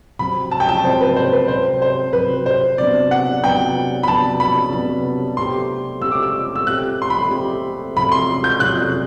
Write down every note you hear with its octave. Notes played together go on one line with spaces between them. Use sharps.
C3 F#3 C4 B5
A5
G5
A5
C3 F#3 C4 C5
B4
C5
B4
C3 F#3 C4 C5
C5
C3 F#3 C4 B4
C5
C3 F#3 B3 D4 D5
F#5
C3 F#3 B3 D4 G5
B5
C3 F#3 B3 D4 A5
B5
C3 F#3 B3 D4
A3 C4 G4 C6
A3 C4 G4 E6
D6
E6
E6
A3 C4 G4 F#6
C6
B5
A3 C4 G4
C3 F#3 A3 B5
C6
G6
C3 F#3 A3 F#6